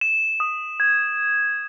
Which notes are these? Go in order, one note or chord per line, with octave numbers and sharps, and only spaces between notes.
E7
D#6
G#6